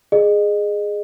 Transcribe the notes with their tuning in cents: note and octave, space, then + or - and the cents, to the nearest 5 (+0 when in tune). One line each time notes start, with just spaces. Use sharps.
G#4 +0 D#5 -30